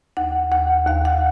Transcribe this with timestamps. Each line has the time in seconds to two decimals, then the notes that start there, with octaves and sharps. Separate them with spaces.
0.17 D#2 F#5
0.52 D#2 F#5
0.87 D#2 F5
1.05 F#5